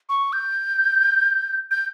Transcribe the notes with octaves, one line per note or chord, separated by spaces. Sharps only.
C#6
G6
G6